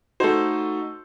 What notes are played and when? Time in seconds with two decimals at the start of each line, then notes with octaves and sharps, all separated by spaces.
0.20 A3 D#4 F#4 A4 C5